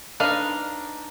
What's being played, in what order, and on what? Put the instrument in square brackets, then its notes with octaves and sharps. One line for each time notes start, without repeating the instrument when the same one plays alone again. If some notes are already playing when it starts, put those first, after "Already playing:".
[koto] D4 D#4 [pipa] B4 D#5 F5